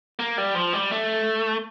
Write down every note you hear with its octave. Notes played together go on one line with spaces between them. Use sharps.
A#3
G3
F3
G3
A3